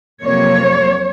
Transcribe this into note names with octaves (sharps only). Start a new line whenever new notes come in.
F2 C3 F#3 A#3 C#5